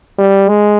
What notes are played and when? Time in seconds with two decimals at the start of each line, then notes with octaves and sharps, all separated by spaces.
0.19 G3
0.49 G#3